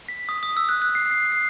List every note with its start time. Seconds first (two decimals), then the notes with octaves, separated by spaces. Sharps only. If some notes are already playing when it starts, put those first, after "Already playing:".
0.09 B6
0.29 D#6
0.43 D#6
0.57 E6
0.69 F#6
0.82 F#6
0.95 C7
1.11 C7
1.32 C7